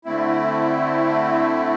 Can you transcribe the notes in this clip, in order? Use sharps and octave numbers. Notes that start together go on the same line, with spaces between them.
D3 A3 C4 E4